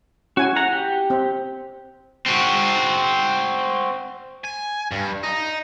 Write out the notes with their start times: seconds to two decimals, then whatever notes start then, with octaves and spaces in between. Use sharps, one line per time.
0.37 C#4 E4 F#4 G#5
0.56 F#5 A#5
0.73 G4
1.10 C4
2.26 C4 F#4
4.44 G#5
4.91 G2
5.23 D#4